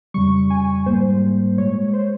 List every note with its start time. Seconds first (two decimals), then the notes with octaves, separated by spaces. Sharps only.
0.14 F2 C#3 G3 C#6
0.50 G#5
0.86 G#2 G3 A#3 C5
1.58 A#2 G#3 C#5
1.93 C5